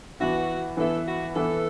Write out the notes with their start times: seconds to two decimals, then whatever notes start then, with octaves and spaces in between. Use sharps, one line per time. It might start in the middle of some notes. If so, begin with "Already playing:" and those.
0.20 E3 B3 E4 F#4
0.77 E3 B3 E4 A4
1.06 F#4
1.35 E3 B3 E4 A4